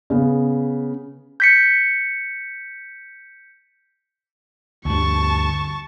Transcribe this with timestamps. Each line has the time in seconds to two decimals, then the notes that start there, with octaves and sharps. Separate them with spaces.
0.10 C#3 B3
1.40 G6 B6 C#7
4.85 D2 G2 A5 C#6